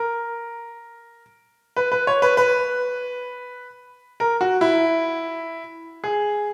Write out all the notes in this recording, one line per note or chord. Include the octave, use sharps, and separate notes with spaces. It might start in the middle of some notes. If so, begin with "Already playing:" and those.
Already playing: A#4
B4
B4
C#5
B4
B4
A#4
F#4
E4
G#4